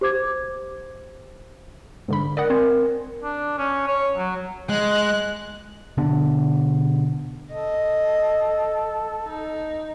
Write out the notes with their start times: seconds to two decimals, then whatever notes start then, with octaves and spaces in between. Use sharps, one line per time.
0.01 G4 C5 D6 G#6
2.08 G#2 D3 B5
2.37 A#4 D5 D#5 F#5
2.50 C4 C5 G#5
3.23 D4
3.58 C#4
3.88 C#5
4.17 F#3
4.69 G#3 D#5 F#6
5.97 B2 D3 B3 D4
7.51 A4 D#5
9.26 D#4